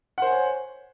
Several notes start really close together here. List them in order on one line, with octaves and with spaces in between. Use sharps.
F#5 C5 G#5 C#5